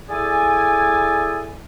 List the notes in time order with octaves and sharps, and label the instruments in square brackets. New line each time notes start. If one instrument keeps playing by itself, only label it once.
[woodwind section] E4 G#4 A4 D5 G#5